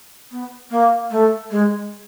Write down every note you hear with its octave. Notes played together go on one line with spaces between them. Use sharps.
B3
A#3
A3
G#3